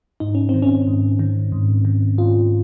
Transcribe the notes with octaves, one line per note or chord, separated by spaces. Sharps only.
G#2 D#4
C#4
D#3 C4
C#4
G#2
D#3
G#2
D#3
G#2 F4